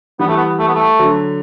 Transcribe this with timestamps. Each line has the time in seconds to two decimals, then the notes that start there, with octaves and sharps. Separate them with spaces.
0.19 E3 G3 B3
0.28 A3
0.36 B3
0.59 A3
0.68 B3
0.75 A3
0.99 D3 F#3